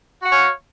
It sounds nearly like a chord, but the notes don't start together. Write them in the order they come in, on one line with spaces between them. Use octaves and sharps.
F#4 F#5 C#5 F5